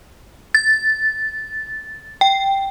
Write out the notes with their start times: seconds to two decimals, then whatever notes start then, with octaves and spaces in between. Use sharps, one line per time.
0.55 A6
2.21 G5